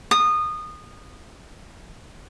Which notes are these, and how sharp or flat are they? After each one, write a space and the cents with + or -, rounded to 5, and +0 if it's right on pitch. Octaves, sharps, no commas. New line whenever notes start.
D#6 -20